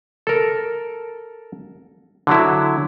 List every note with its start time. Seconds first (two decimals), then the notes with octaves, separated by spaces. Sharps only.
0.27 A4 A#4
2.27 D3 F#3 E4